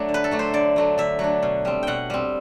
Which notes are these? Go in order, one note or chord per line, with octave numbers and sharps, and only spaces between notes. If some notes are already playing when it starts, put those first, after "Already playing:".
Already playing: F#3 A3 D4
D3
B4
A4
F#3 A3 D4
C5
D3 D5
F#3 A3 D4
D3 E5
F#3 A3 D4
B2
G3 C4
B2 F#5 G5
G3 C4